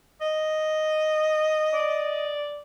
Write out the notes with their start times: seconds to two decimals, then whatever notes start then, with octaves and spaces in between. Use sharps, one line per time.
0.21 D#5
1.73 D5